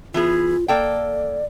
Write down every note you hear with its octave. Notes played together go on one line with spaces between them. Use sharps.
E3 B3 F4 G#4
A#3 A4 D5 G5